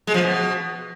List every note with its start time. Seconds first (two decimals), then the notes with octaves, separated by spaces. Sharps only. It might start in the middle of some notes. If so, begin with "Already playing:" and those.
0.07 G#3
0.14 F3
0.21 B2